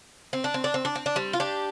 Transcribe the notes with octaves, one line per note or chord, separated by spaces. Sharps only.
C4
D4
C4
D4
C4
D4
C4
D4
G3 C4
F4
D4 G4